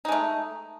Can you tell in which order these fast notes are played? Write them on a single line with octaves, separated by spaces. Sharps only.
D#4 G#3 A3